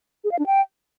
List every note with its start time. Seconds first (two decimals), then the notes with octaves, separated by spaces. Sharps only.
0.24 G#4
0.32 F5
0.39 D4
0.46 G5